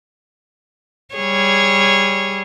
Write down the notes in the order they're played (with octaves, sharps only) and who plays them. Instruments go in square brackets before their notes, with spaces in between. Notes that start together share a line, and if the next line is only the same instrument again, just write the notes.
[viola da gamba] G3 G#4 C#5